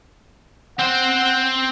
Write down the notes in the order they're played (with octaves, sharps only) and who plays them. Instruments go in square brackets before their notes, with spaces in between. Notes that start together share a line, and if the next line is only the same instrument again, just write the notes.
[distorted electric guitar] C4 C5 [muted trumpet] F#5